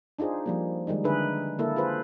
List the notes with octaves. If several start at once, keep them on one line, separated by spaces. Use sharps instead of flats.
D4 D#4 F4 G#4 C5
F3 G3 A#3
D#3 G3 G#3 D#4
D3 D4 D#4 G#4 B4 E5
D3 A#3 E4 A4 A#4
F4 G#4 B4 C5